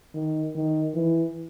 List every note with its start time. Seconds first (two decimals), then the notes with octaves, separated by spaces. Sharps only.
0.14 D#3
0.56 D#3
0.95 E3